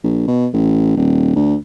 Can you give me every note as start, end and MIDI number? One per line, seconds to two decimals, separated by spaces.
0.04 0.26 34
0.28 0.48 47
0.53 0.93 33
0.97 1.34 27
1.36 1.56 38